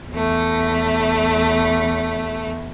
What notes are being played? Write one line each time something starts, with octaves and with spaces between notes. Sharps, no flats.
E2 A3